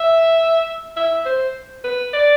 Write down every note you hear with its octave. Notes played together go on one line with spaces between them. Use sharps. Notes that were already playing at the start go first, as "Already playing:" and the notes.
Already playing: E5
E5
C5
B4
D5